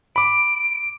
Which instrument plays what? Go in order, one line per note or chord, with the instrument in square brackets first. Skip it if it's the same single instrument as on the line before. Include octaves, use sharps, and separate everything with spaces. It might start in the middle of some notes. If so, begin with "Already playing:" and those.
[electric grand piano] B5 D6 [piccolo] D7